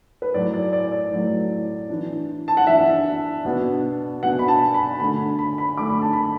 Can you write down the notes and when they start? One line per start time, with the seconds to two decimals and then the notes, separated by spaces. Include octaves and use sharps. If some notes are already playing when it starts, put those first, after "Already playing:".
0.22 B4
0.34 A2 F#3 A3 D5
0.54 D5
0.73 D5
0.92 D5
1.12 A2 F#3 A3
1.89 E3 D4
2.48 A5
2.57 F#5
2.67 E3 D4 E5
3.45 B2 B3 D4
4.22 B2 B3 D4 F#5
4.39 B5
4.48 A5
4.74 B5
5.00 D3 A3 D4 B5
5.39 B5
5.58 B5
5.78 D3 A3 D4 D6
5.90 B5
6.02 A5
6.13 B5